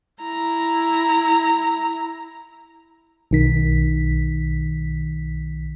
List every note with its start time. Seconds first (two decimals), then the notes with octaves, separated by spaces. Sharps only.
0.23 E4 A#5
3.31 B1 D#3 B6